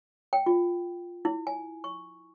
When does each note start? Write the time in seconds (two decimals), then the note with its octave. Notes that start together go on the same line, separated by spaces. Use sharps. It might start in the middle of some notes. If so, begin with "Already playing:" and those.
0.33 G5
0.46 F4
1.25 E4
1.47 G#5
1.84 C#6